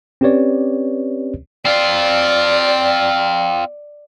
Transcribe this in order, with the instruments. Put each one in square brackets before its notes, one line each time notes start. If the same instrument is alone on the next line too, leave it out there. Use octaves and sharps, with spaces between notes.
[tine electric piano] C4 C#4 G4 B4 C#5 D5
[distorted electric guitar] C4 F4 [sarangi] D5